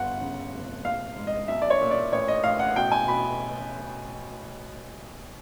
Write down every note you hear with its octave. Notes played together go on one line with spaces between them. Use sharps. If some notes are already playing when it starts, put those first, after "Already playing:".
Already playing: G1 F#5
C#3
F1
A#1 F5
G#2
D#5
B1 E5
D5
C#5
A#2
D5
A1 C#5
D#5
A1 F5
F#5
B2 G5
G#5
B2 B5